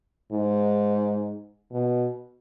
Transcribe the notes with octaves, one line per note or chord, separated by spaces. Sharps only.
G#2
B2